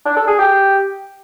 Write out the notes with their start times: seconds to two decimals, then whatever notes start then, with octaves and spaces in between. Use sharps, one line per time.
0.06 D4
0.17 A4
0.28 G#4
0.39 G4